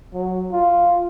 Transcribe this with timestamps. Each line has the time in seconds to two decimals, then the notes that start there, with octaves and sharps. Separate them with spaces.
0.13 F#3
0.52 F4